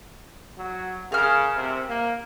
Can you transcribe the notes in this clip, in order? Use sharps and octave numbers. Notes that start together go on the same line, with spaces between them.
F#3
C#3 A#4 F6
C3
A#3